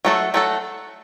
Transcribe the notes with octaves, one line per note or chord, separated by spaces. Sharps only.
F#3 A3 F#4 A4
F#3 A3 F#4 A4